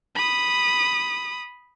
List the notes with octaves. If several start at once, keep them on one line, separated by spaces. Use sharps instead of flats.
B5 D#6